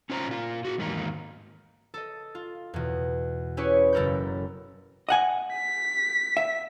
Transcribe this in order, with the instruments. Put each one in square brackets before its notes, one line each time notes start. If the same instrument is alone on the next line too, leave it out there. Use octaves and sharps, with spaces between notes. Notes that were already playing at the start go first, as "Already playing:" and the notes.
[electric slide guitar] C#4 F4 C5 A5 A#5
A#2 F4
F#4 G#4
E2 G#2 D#3 A#3 D#4
[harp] A4 D#5
F4
E2 B2
C#4 E4 G4 G#4 B4 C#5
F#1 A4 A#4 B5 G6
[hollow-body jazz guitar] D#5 F#5 G#5
[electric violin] B6
[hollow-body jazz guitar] E5